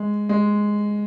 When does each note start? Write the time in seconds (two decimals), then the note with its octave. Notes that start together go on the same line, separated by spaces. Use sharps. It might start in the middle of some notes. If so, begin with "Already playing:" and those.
Already playing: G#3
0.29 G#3